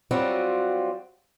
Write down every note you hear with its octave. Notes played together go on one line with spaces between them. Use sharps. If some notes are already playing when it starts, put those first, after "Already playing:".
F#3 G3 C4 F4 F#4